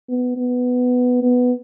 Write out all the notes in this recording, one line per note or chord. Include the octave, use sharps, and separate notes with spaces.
B3
B3
B3